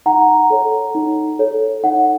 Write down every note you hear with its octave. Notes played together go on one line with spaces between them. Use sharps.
D#4 F#5 A#5
A4 C#5
D#4
A4 C#5
D#4 F#5